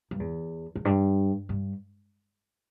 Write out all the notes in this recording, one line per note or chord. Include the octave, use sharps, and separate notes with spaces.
G2
E2
E2
G2
G2